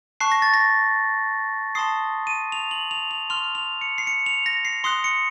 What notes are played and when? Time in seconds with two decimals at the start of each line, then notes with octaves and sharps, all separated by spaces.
0.20 A5 C#6 F#6 C7
0.32 A#6
0.42 A6
0.54 A#6
1.75 A5 C6 D#6 C7
2.27 D#7
2.52 F7
2.71 F#7
2.91 F7
3.11 F7
3.30 C6 F6 F7
3.55 F7
3.81 C#7
3.98 C7
4.07 C#7
4.26 F7
4.46 A#6
4.65 C7
4.84 C6 D#6 F#6 C7
5.04 C#7